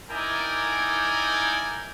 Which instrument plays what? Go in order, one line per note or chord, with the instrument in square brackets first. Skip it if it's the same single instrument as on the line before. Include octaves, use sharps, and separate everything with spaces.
[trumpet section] D#4 E4 A#4 D5 G5 G#5